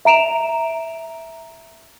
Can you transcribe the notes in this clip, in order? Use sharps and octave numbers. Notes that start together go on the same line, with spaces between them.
E5 A#5 D7 E7 F7